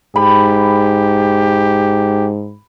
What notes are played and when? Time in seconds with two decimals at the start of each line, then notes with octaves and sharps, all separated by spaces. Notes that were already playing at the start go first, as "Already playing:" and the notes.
0.16 G#2 G4 B5